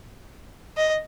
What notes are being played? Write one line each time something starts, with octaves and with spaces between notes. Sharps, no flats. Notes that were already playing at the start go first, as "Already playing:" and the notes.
D#5